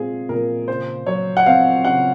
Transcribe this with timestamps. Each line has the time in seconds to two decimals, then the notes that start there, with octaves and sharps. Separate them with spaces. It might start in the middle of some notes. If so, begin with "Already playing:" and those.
Already playing: A#2 G#3 C4 F4 G#4
0.29 A#2 A#4
0.68 C#3 C5
1.06 F#3 C#5
1.37 F#5
1.46 C4 F5
1.85 C#3 F#5